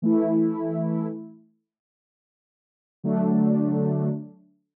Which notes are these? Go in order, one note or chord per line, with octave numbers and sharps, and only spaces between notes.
E3 A3 E4
D3 F#3 A3 D4